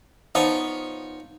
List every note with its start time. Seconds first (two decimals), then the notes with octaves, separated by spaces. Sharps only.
0.35 F3 B3 D#4 C#5 D5